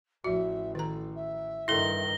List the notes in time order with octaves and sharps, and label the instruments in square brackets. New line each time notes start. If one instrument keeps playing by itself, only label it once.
[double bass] A1 [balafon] F3 F#4 [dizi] E5
[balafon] D#3 A#5 [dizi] A4
[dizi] E5
[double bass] G2 D#3 [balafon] E4 A4 [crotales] A#6 G7